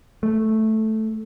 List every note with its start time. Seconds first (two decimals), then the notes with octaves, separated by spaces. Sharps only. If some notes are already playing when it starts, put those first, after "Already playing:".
0.23 A3